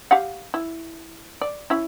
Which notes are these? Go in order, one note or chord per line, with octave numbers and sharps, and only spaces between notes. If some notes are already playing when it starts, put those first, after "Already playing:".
G4 F5 F#5
E4
D5
C#4 E4